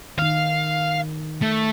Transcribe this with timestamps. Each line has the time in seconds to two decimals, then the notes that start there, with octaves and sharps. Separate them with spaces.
0.18 D#3 D#4 F5
1.42 A3